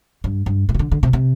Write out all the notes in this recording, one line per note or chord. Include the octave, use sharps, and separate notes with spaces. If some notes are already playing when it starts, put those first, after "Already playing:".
G2
G2
A2
C3
D3
D3
C3
C3